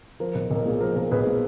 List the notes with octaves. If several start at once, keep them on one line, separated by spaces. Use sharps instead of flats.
F3 A#4
B1
B1 A#4
A#2 G#4
F3 A#4
B1 A#4
B1 G#4 B4
A#2